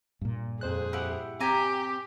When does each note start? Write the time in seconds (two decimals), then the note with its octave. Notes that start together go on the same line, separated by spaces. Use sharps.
0.21 G2 A#2
0.61 F2 G#4 C5 F#6
0.93 E4 G4 F#5
1.41 C4 G4 G#5 A#5